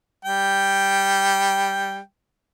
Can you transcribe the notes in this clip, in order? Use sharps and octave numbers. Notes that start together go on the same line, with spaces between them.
G3 G5